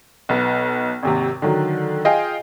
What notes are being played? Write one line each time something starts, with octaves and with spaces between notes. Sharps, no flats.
B1 B3
G#1 D#2 C3
D3 D#3 F#3
F4 G#4 D#5 F5 G5